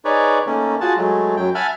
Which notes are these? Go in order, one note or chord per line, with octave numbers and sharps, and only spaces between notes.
D#4 G#4 B4 C#5 D5
D#3 A3 A#3 C#4
F4 F#4 G#4 F#5 A5
F#3 G#3 A3
F#2 F#3 G5
E5 F#5 G#5 A5 B5 F6